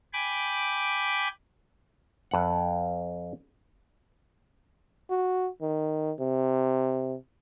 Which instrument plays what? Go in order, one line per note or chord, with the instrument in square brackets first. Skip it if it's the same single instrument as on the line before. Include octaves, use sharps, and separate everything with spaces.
[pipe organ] G5 G#5 B5 D6
[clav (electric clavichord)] F2 F#5
[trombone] F#4
D#3
C3